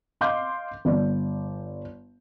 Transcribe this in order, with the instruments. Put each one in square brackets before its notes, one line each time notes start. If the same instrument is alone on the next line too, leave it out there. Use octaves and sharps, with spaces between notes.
[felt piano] D#5 F5 C6 D6 G6
G1 D5